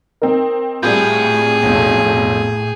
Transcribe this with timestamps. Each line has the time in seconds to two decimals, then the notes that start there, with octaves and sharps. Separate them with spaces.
0.22 C4 D#4 A#4
0.83 A2 G3 C4 F4 G#4 G6
1.63 B1 F2 B2